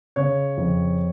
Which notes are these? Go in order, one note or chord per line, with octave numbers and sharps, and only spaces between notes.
C#3 C#5
F2